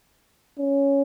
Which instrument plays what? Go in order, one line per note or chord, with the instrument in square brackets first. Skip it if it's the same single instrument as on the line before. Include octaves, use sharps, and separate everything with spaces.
[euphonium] C#4